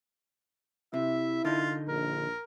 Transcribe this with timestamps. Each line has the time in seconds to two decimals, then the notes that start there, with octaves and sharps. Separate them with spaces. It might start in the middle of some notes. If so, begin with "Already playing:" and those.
0.94 C3 E4 E5
1.45 D3 D#4 F4
1.88 A#1 A#4